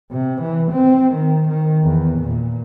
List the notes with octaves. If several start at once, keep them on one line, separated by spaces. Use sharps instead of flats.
C3
E3
C4
D#3
D#3
E2
A#2